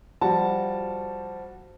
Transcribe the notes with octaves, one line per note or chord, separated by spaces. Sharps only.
F3 G3 F#4 A5